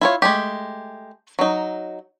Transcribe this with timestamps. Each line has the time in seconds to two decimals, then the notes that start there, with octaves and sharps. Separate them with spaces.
0.01 E4 F4 C#5
0.22 G#3 A3 G4
1.39 F#3 D#4